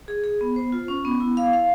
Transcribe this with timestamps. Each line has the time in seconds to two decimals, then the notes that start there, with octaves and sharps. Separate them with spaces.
0.08 G#4
0.24 G#4
0.41 B3
0.56 C5
0.72 F4
0.88 C#4
1.05 B3
1.20 E4
1.37 F5
1.53 F5